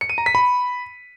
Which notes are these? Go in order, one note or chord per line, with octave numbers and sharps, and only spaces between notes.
C#7
D#7
A#5
B6
B5